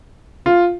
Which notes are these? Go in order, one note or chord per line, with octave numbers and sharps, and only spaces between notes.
F4